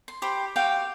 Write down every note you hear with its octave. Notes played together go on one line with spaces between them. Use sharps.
C6
G4 C5 B5
F#4 G4 F5 G5